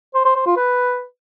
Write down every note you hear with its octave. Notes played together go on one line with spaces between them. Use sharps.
C5
C5
C5
F4
B4